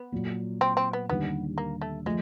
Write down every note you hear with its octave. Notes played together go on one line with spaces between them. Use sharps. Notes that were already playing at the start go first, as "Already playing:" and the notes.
Already playing: B3
A#2 F#3 A#3
C4
C4
B3
D#2 D3 G3 B3
A#3
A3
F3 G#3 A3